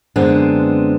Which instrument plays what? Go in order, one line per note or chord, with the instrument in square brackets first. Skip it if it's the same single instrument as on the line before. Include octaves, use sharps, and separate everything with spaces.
[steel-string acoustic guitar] F#2 D3 G#3 B3 C4 D4